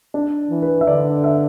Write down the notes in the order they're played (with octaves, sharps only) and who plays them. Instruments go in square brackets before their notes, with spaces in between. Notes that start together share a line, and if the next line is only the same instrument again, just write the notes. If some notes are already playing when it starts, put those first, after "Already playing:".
[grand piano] D4
[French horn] E3
[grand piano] B4
E5
[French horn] D3 [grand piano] D5
[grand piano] E5